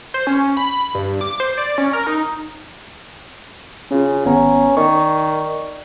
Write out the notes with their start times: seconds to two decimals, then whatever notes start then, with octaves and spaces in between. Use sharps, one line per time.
0.14 C5
0.27 C#4
0.57 B5
0.95 G2
1.21 D6
1.40 C5
1.58 D5
1.78 C#4
1.93 A#4
2.07 D#4
3.91 C#3 C#4 F4
4.26 G#1 B3 C#4 A#5
4.77 D#3 D5 C#6